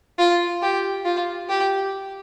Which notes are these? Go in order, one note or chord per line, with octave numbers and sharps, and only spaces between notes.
F4
G4
F4
G4